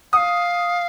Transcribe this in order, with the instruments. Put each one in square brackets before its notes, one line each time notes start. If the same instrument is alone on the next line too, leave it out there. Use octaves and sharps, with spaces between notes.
[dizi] F5 F#5 [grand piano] D#6